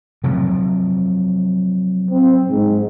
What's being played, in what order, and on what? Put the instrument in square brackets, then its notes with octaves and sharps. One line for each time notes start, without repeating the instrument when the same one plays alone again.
[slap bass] C3 F3 F#3
[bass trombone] C4
G#2